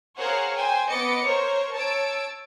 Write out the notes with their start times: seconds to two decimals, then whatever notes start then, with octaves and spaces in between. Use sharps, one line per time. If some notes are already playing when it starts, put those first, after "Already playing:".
0.18 G#4 A#4 C5 C#5 F5 F#5
0.55 C5 G5 G#5
0.91 B3 D#5 D6 A6 C#7
1.26 A#4 C5 C#5 C#6
1.76 C#5 A5 E6 D7